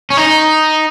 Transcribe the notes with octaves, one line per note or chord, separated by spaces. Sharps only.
C#4
D#4